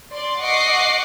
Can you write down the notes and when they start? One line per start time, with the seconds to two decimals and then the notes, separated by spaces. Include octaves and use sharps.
0.12 D5 C6
0.41 D#5 F#5 C#6 D6 C7